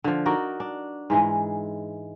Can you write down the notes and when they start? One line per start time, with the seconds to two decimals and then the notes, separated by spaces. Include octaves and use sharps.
0.04 D3 F3
0.25 D#4 F#4 A#4 D5
0.60 D4
1.10 G#2 E3 G#3